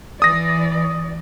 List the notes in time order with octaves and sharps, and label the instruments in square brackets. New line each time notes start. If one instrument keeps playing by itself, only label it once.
[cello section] E3 D5 [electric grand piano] D#6 A#6